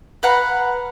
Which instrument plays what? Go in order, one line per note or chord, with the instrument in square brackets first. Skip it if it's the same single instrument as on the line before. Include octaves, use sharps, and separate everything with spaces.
[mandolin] B4 F5 F#5 A#5